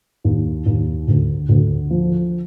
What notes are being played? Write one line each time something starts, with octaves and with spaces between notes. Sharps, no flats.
D#2
D#2
D2
D2
F3